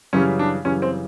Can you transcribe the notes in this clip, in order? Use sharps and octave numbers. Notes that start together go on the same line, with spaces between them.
F#2 C#3 E3 G3 C#4
D4
F#2 C#3 E3 G3 C#4
C4